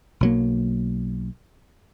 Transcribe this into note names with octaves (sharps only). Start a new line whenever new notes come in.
B1 F#3 A#3